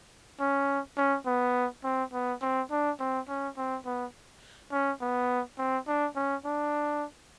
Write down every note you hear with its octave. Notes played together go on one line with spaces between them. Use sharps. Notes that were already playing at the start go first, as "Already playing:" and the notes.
C#4
C#4
B3
C4
B3
C4
D4
C4
C#4
C4
B3
C#4
B3
C4
D4
C#4
D4